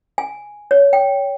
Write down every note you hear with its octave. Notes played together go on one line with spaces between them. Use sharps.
G#5
C#5
G5